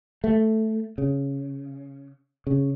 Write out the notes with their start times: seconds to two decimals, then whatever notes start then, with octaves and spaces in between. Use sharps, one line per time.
0.24 A3
0.98 C#3
2.47 C#3